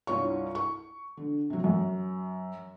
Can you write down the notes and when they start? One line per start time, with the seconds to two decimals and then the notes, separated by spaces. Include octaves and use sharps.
0.07 C2 G2 F4 C#5 C#6
0.55 C#6
1.17 D3
1.50 C3 F#3
1.64 F#2